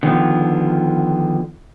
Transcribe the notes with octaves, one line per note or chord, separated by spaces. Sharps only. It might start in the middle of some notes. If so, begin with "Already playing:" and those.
D3 D#3 F3 B3